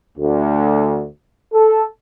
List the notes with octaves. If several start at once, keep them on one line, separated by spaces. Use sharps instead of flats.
D2
A4